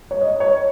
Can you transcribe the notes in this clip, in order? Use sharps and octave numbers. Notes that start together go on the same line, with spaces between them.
C#5
D#5
C#5